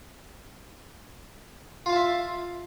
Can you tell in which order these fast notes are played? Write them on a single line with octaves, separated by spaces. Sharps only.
F4 F5 A5 E5